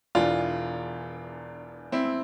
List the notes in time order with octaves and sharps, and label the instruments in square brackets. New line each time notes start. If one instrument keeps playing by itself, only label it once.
[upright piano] E1 E2 E3 D4 F4
C4 E4